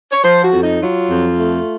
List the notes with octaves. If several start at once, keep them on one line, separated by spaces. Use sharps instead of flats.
C#5
F3 C5
F#4
F2
D#4
F#3 F4
F2
A3